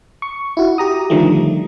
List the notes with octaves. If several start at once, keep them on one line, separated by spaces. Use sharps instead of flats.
C#6
E4 F#4
G4 A#5 D#6
D3 D#3 F3 G3 A3